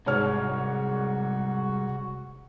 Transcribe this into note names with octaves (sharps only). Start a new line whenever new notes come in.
C2 G#2 F#4 C#5 F6